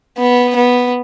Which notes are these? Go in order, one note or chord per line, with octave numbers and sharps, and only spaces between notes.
B3
B3